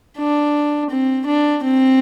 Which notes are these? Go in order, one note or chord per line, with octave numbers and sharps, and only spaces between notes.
D4
C4
D4
C4